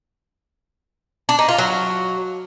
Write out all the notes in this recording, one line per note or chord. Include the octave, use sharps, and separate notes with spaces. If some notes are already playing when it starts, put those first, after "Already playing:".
D4
D#4
F4
F#3